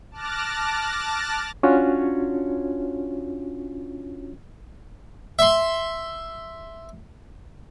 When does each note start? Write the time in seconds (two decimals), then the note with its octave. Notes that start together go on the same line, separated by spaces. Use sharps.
0.11 A5 D6 F6 F#6 A6 A#6
1.63 C#4 D4 F4 F#4 C#5
5.39 E5 C6